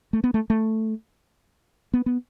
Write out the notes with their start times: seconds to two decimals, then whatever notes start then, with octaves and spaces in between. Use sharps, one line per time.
0.13 A3
0.24 B3
0.34 A3
0.50 A3
1.94 B3
2.06 B3